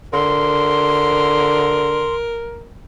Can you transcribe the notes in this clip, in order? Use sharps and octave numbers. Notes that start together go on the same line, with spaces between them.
D3 A#4 C6